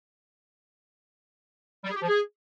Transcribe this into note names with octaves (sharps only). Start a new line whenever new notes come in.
G3
G#4
G4
F3
G#4